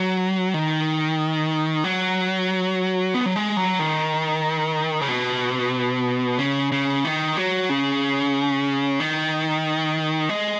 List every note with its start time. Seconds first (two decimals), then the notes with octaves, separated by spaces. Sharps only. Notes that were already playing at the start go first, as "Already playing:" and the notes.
Already playing: F#3
0.54 D#3
1.84 F#3
3.14 B3
3.26 F#3
3.36 G#3
3.57 F#3
3.79 D#3
5.01 C#3
5.08 B2
6.39 C#3
6.72 C#3
7.05 D#3
7.37 F#3
7.69 C#3
9.00 D#3
10.29 G#3